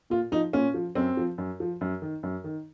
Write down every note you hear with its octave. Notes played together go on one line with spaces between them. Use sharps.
A#2 F4
F3 D#4
A#2 C#4
F3
F#2 C4
F3
F#2
F3
F#2
D#3
F#2
D#3